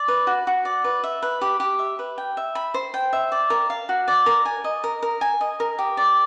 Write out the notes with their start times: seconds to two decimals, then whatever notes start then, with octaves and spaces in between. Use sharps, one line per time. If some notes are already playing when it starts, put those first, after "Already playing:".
Already playing: D5
0.08 B4
0.27 F#4
0.47 F#4
0.65 D5
0.84 B4
1.04 E5
1.22 B4
1.41 G4
1.60 G4
1.79 E5
1.99 B4
2.18 G5
2.37 E5
2.55 B5
2.74 C5
2.94 G5
3.13 E5
3.32 D5
3.50 A#4
3.70 F5
3.89 F#4
4.08 D5
4.26 A#4
4.45 G#5
4.64 D#5
4.84 A#4
5.03 A#4
5.21 G#5
5.41 D#5
5.60 A#4
5.79 G4
5.97 D5